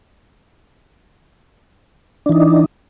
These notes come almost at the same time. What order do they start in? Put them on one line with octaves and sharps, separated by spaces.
D4 E3 D#4